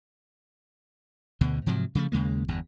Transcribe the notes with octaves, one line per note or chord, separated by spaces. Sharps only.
D2 B2 D3
G#2 C3 F3 F#3
C#3 F3 G#3 A3
D#2 C#3 G#3 A#3
G1 E2 G2